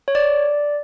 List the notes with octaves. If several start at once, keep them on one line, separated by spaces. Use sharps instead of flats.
C#5
D5